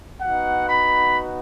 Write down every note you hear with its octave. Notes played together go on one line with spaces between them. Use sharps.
B3 D#4 F#4 F#5
B5